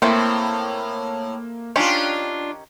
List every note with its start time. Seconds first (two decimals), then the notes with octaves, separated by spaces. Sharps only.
0.02 A2 A3 A#3 C4 E4
1.76 D#3 C#4 D4 F4 G4